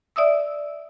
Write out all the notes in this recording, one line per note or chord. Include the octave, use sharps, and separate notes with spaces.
D5 E5 D#6 E6